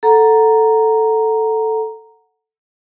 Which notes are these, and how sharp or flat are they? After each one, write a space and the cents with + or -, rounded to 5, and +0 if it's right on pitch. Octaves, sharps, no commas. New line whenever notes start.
A4 +0 F#5 +0 A#5 +0